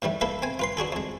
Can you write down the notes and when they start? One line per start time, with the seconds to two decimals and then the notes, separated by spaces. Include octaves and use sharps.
0.02 A2 E3 G3 A3
0.21 A#3 E4 A4 B4 F5
0.42 C4 G#5
0.59 F4 B4 C6
0.77 D4 F#4 G#4 A4
0.92 F2 G#3